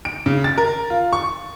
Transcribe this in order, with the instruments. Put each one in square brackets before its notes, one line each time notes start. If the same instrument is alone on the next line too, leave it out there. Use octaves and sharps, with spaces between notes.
[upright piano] D7
C#3
A6
A#4
F4
C#6